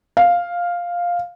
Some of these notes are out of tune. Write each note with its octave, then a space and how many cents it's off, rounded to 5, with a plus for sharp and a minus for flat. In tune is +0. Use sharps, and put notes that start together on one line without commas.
F5 +5